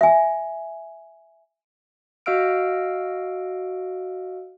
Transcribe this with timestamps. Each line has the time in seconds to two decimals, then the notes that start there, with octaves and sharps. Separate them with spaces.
0.01 E5 G#5
2.26 F#4 D#5 F5 E6 F6 D7